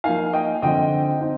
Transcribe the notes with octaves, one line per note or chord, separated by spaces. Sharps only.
F3 A#3 D#4 F5 G#5
D#5 G5
D3 F3 C4 D#5 G5
C4 D#4